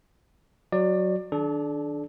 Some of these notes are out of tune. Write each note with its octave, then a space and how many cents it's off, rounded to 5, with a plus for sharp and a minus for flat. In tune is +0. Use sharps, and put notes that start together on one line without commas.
F#3 +0 F#4 +0 D5 +20
D#3 +0 D4 +0 A4 -40